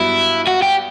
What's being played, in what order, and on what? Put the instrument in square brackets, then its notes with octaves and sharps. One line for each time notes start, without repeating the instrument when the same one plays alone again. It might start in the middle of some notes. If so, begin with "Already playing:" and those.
Already playing: [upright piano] G2 F#3 B3 [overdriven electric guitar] E4
[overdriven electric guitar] F#4
G4